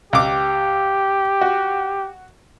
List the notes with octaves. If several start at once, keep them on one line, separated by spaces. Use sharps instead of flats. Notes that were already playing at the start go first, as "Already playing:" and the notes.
C#2 G4 D6
F#4